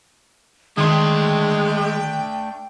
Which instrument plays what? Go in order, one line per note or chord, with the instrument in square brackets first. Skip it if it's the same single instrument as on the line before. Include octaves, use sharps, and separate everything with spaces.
[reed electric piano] D#3 C6 [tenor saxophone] G#3 [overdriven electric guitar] A3 D4 [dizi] G5